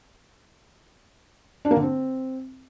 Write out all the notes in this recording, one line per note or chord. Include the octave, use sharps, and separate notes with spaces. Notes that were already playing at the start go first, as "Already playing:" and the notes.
D4
A#3
D3
C4